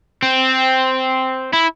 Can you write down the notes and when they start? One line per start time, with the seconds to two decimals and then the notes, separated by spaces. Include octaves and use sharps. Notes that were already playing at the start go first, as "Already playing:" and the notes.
0.23 C4
1.53 E4